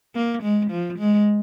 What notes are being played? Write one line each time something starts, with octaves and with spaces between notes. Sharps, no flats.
A#3
G#3
F3
G#3